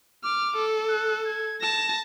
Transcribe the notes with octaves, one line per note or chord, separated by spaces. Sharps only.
D6 F6
A4
F#6
G#6
A5 A#6 E7